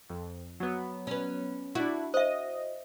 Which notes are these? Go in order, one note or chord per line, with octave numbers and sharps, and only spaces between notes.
F2
F#3 B3
C#4 B4
D4 E4 F#4
C5 D#5 E5